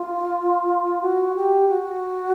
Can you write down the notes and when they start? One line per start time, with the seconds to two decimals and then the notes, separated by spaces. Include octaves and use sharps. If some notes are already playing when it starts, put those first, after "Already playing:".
Already playing: F4
1.02 F#4
1.35 G4
1.69 F#4